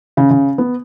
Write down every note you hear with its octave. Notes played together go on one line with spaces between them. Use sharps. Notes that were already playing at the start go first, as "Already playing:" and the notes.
C#3
C#3
B3